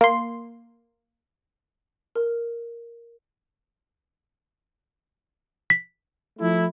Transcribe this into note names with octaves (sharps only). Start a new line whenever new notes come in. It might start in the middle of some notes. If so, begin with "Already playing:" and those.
A#3 C6
A#4
B6
F3 A3 E4